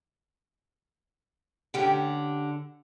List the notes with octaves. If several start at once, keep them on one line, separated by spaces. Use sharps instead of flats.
D3 C#4 G4